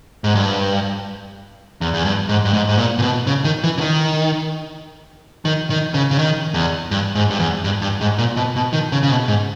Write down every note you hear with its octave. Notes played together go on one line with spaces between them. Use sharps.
G#2
G2
E2
E2
G2
G#2
G2
G#2
G#2
A#2
A#2
B2
C#3
D#3
E3
C#3
D#3
D#3
D#3
C#3
C#3
D#3
E2
G2
G#2
G2
E2
G2
G2
G#2
A#2
B2
B2
D#3
C#3
C#3
B2
G#2